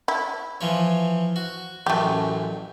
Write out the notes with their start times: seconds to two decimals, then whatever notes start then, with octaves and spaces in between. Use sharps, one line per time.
0.08 E4
0.61 E3 F3 C#5
1.36 F#4
1.86 A1 F#2 A3 G4